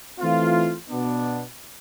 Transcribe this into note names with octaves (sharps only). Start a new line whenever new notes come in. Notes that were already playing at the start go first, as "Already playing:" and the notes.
E3 A3 C4 F4
B2 B3 D4